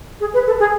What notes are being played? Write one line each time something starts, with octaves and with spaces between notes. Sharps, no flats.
G#4
B4
A4
G#4